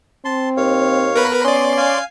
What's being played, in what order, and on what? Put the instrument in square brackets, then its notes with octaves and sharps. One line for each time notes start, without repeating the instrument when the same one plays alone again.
[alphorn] C4 [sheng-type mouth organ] A5 C6
[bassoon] D#2 [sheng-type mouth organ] C#5 F5
[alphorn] B3 [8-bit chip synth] A#4 B4 B5
[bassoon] C#4 [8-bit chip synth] D5 C6 [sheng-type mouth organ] D#6
[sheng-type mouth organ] F5 G#5